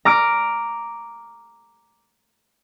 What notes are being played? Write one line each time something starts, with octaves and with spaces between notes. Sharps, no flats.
A#5 D6 F6 D7